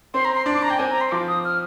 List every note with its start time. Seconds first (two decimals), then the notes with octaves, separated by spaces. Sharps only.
0.14 C4 C6
0.25 A#5
0.35 C6
0.46 D4
0.54 D6
0.63 A#5
0.70 G5
0.78 C4 G#5
0.90 A#5
1.01 C6
1.12 F3 D6
1.28 D#6
1.45 F6